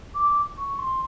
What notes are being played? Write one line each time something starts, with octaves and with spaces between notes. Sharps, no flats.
D6
C#6
C6